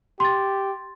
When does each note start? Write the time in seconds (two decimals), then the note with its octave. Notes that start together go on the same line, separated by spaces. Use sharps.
0.20 G4 C6 A6